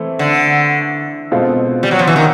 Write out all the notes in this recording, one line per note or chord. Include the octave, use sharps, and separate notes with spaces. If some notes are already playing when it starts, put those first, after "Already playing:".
Already playing: E3 A3 C4 E4
D3
B2 G#3 C4 F4 A4
G3
F#3
F3
E3
D#3